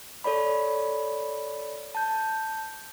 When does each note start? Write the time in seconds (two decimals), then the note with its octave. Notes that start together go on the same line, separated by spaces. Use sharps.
0.24 A4 C#5 D5 B5
1.95 A5 G6